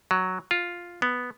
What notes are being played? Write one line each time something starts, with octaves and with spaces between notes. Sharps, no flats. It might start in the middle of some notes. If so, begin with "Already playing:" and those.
F#3
F4
B3